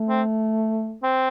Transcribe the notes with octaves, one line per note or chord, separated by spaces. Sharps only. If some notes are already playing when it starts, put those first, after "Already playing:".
Already playing: A3
C4
C4